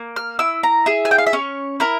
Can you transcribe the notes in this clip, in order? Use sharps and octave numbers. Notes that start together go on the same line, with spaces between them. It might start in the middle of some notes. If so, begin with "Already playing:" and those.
Already playing: A#3
F6
E4 E6
A#5
G#4 E5
G#5
G5
F5
E5
C#4 C#5
E4 A#4